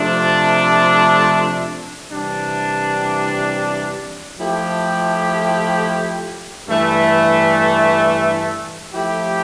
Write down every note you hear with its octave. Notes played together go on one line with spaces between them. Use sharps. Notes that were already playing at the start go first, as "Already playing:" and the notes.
Already playing: C3 F3 A3 D4
C3 E3 G3 D4
F3 A3 E4 G4
G2 E3 A3
F3 A3 E4 G4